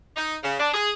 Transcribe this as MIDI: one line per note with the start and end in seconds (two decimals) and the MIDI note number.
0.17 0.35 63
0.44 0.55 49
0.59 0.69 62
0.74 0.92 68